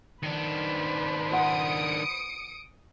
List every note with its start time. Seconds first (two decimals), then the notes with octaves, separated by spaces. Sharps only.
0.23 D#3 D4 B4 C5
1.32 F4 F#5 D#6 C#7 D7